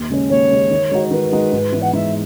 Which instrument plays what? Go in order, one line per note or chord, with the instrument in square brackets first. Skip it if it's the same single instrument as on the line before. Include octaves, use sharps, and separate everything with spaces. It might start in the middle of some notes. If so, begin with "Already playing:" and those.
Already playing: [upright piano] D#2
C#3 G#3 C#4
[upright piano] D#2 [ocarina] C#5
[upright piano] C#3 G#3 C#4
D#3
G#3 D#4 F#4
[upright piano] D#3 [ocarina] B4
[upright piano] G#3 D#4 F#4
G#2
E3 G#3 B3
[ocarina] F#5
[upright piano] G#2 [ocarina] E5